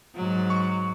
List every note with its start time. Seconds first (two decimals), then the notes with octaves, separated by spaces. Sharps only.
0.15 G#2 F#3
0.50 C#6